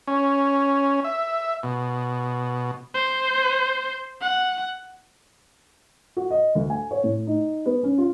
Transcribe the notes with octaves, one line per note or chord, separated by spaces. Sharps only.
C#4
E5
B2
C5
F#5
F#4
D#5
D2
G#5
C#5
A2
D#4
B3
C#4
F4